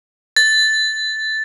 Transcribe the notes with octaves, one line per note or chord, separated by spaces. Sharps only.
A6